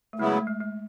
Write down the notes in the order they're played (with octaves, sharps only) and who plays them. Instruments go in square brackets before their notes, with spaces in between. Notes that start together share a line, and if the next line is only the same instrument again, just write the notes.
[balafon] A3
[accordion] F#2 C#3 F#3 B3 E4 [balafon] G#3
[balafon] A3
G#3
G#3